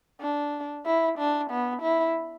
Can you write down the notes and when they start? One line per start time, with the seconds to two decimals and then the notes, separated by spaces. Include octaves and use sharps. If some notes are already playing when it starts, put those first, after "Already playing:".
0.21 D4
0.86 E4
1.18 D4
1.51 B3
1.82 E4